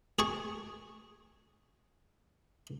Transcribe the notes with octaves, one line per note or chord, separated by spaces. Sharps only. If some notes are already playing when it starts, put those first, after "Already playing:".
G#4 G#5 C#6